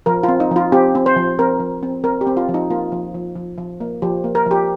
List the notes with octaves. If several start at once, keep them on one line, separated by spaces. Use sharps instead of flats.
F3 A#4
C4 F4
D#4
F3 F4
C4 G4
C4
C5
F3
C4 A#4
F3
C4
C4 A#4
G4
C4
F4
F3
D#4
A#3 F4
F3
F3
F3
F3
A#3
F3 G4
A#3
A#4
F3 G4